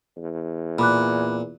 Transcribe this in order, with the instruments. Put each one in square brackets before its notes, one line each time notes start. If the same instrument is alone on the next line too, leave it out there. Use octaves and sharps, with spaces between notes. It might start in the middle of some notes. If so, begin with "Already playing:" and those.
[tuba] E2
[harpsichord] A#2 [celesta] B5 D6 F#6